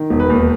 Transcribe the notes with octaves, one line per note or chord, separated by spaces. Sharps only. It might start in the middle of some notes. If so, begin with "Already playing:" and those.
Already playing: D#3
E1
B4
D#2